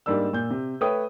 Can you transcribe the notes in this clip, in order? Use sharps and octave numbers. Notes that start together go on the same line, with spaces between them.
G#2 G3 A#3 D4 E6
A#2 G6
C3
A3 B4 C#5 G5 D#6